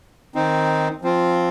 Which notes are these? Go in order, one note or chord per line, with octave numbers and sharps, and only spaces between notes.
D#3 C4 D#4
F3 C4 F4